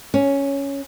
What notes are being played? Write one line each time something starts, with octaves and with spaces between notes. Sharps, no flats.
C#4